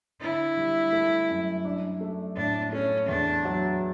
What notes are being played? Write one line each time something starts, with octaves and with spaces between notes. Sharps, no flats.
D3 E4
G3
A3
F#2
D4
A3
A2 D4
A3 C#4
E2 D4
F#3